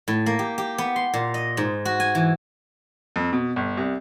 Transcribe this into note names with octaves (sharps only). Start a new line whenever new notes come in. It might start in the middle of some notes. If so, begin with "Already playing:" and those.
A2
A#3
G4
G4
B3
C6
A#2
D#5
G#2
F#4
G#5
E3
F2
B2
G1
C2